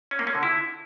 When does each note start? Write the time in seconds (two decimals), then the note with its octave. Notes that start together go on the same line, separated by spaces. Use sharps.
0.11 C#4
0.19 A#3
0.27 C#4
0.35 D3
0.43 E4